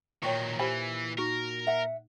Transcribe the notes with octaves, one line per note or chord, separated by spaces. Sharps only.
A#2 D#3 F#3 C#5 G5 C#6
E3 G4 C5 G#5 B5
D#4 F#4 A#4
E5 F#5